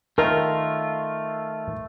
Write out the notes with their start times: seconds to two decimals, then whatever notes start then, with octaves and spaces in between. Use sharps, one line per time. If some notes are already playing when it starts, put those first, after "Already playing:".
0.18 D#3 A3 F4 A#4